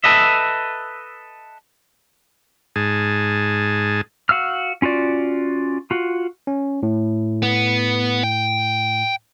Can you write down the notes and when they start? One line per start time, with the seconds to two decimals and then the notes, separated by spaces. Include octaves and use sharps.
0.04 A4 B4 D#5 E5
2.76 G#2 G#4 A5
4.29 F#4 F5 E6 F6
4.82 C#4 F4 F#4 D5
5.91 F4 F#4
6.47 C#4
6.83 A2
7.42 B3
8.24 G5